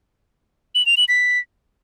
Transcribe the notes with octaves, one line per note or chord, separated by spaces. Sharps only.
F#7
F7
F#7
B6